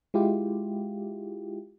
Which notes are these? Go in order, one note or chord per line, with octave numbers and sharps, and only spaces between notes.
G#3 E4 F4 G4